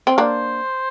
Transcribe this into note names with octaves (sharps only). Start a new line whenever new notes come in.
C4
A#3 D4 C5